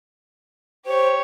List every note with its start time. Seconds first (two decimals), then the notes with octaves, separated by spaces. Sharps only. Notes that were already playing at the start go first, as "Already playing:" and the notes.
0.86 G4 C5 C#5